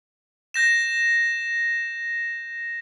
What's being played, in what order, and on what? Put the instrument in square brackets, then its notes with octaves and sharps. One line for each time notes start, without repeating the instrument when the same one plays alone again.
[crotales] G6 A#6 E7